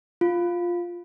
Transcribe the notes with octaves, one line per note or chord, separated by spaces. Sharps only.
F4